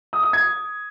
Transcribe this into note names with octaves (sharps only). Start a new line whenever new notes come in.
D#6
D#6
G#6